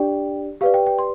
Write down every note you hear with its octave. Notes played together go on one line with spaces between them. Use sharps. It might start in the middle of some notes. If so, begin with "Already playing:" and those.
Already playing: D4 G4 D5 G5
G4 B4 D5 F5
G5
G5
C6